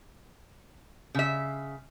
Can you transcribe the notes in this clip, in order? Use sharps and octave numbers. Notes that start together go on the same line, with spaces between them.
C#3 E5